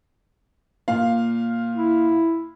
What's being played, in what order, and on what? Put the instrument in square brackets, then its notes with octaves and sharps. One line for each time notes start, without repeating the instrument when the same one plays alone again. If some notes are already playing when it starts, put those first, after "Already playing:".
[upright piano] A#2 F5
[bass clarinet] E4